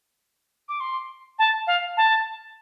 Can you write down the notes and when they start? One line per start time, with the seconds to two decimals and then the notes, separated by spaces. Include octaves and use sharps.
0.69 D6
0.80 C6
1.39 A5
1.67 F5
1.97 A5